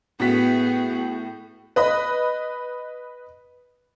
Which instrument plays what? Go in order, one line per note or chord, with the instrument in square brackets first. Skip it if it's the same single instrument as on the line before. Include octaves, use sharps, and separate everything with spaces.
[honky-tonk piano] A2 F#4 B6 [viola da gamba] B3 G#4
[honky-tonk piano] B4 D#5 B5